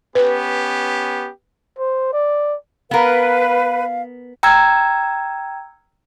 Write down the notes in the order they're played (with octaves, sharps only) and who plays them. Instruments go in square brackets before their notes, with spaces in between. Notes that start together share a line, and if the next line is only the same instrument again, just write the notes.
[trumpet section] B3 C#4 G4 [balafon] B4
[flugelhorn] C5
D5
[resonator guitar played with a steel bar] B3 A#4 [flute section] B4 [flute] F5
[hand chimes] G5 A#5 E6 F6 G#6